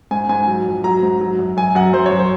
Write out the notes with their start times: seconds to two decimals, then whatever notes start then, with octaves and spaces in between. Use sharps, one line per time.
0.11 G#2 G#5
0.29 G#2 G#5
0.48 F#3
0.66 F2
0.84 F#3 A#5
1.03 G#2
1.21 F#3
1.39 F#2
1.57 F#2 G#5
1.75 F#2 F#5
1.93 F#2 C5
2.06 C#5
2.11 F#2
2.19 C5